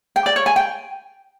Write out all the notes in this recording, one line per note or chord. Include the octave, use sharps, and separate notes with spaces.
G5
D5
C#5
G#5
G5